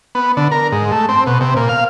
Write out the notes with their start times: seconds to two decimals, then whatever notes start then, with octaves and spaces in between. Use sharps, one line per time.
0.15 B3
0.37 D3
0.51 A#4
0.72 G#2
0.92 A3
1.09 C4
1.27 B2
1.41 C3
1.57 A#2
1.69 F5